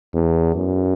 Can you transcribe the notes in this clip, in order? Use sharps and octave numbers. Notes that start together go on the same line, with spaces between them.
E2
F#2